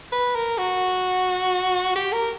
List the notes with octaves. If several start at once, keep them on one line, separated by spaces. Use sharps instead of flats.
B4
A#4
F#4
G4
A#4